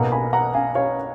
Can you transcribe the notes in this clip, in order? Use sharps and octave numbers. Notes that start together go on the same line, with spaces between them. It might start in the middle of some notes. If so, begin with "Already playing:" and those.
Already playing: B1 B2 A#3 F#5 A#5
G#5 B5
F#5 A#5
F5 G#5
C#5 F5